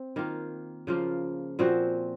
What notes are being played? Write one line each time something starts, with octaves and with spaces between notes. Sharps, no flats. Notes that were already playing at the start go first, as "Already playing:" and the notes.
Already playing: C4
D#3 A#3 F4
C#3 F3 A#3 F4
A#2 F3 C4 F#4